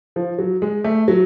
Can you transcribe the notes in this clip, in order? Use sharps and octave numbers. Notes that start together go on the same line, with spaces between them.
F3
F#3
G#3
A3
F#3